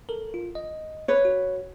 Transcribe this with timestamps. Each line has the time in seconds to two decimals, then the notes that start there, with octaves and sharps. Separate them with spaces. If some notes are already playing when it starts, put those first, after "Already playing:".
0.09 A4 A#4
0.34 F4
0.55 D#5
1.08 B4 C#5
1.25 F#4